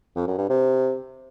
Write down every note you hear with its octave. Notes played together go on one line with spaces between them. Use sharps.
F2
F#2
G2
C3